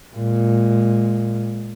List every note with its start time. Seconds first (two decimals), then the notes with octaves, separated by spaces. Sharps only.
0.15 A#2 G#3